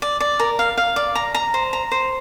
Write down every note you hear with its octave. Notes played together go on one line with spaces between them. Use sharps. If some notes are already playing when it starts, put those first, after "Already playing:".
D5
D5
A#4
F5
F5
D5
A#5
A#5
C5
A#5
C5